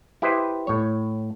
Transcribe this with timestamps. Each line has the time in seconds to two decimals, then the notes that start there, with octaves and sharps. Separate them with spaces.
0.22 E4 G4 B4 C5 D#5
0.67 A2 C#5